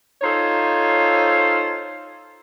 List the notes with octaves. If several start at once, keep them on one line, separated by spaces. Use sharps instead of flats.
D#4 F4 A4 C5 C#5